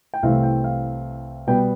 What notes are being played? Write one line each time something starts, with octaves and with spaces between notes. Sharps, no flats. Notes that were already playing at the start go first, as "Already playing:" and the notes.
G5
C2 C3 E3 A3 C4 F5
G5
F5
B2 G3 B3 G5